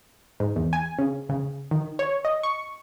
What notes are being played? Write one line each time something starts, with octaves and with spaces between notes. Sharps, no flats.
G#2
E2
G#5
C#3
C#3
D#3
C#5
D#5
C#6